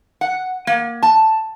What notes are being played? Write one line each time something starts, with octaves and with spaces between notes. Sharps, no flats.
F#5
A#3
A5